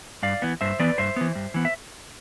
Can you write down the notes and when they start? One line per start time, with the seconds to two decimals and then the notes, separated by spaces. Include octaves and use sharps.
0.23 G2 D5 F5
0.42 E3 B3
0.61 G2 C5 E5
0.79 E3 B3 B4 D5
0.98 G2 C5 E5
1.16 E3 B3
1.35 G2
1.54 E3 B3
1.65 E5